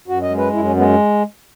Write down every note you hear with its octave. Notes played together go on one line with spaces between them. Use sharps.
F#2 F#4
D#5
G#3
B4
F#2 E4
C#4
G#3 B3